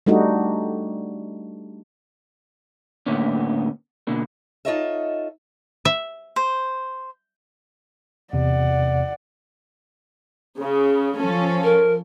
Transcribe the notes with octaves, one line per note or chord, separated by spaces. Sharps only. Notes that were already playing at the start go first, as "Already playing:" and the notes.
G3 A3 D4 D#4 F#4
A2 D3 A#3 B3 C#4
B2 D3 A#3
D#4 F4 A4 C#5 D#5 E5
E5
C5
E2 C3 D5 F#5
C#3
F3 C#4 A4
A#4